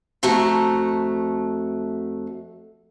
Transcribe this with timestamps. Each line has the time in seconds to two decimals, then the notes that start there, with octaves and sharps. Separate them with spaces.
0.23 F2 A3 F#4 A5 A#5